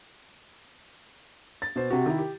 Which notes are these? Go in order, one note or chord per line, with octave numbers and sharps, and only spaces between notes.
A6
B2 C5
C3 F#4
D#3 E4
G4